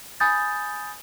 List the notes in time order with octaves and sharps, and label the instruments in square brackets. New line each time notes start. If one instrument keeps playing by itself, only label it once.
[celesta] G#5 B5 D#6 G6 A6